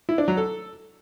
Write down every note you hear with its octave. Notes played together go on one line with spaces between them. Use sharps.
E4
D4
F#3
A4